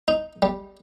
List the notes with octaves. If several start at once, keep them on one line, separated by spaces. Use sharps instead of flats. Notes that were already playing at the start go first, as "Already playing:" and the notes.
D#4
G3